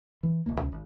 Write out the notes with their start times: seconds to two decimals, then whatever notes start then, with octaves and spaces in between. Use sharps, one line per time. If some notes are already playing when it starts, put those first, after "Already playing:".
0.23 E3
0.46 D1 C2 A#3
0.59 C#2 C3 C#4
0.72 G#1